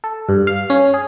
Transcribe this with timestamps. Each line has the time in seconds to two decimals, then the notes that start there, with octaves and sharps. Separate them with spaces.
0.04 A4
0.29 G2
0.47 F5
0.70 C#4
0.94 G#4